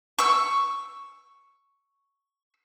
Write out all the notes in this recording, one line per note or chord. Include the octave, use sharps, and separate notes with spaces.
C#6 E6